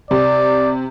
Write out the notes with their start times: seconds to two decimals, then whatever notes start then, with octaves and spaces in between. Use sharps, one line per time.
0.11 C3 D5